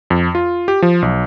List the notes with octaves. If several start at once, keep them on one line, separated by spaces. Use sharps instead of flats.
F2
F4
G4
F3
B1